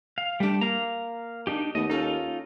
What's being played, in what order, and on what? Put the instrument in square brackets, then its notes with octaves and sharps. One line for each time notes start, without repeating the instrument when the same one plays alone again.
[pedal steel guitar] F5
[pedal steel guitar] G3 D4 [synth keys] A3 G4
[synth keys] A#3 [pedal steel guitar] F5 A#5
[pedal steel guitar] D4 D#4 G4
[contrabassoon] D#2 [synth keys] A3 B3 [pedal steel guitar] D#5
[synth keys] C#4 A4 [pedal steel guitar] D#4 F4